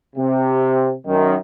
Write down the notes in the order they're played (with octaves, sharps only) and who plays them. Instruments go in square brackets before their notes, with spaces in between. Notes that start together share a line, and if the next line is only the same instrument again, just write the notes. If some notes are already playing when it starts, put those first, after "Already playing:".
[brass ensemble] C3
F#2 D#3